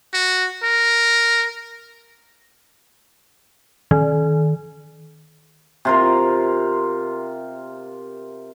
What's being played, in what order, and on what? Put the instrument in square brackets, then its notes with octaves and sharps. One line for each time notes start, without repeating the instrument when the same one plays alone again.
[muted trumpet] F#4
A#4
[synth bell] D#3
[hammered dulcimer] C3 F4 A#4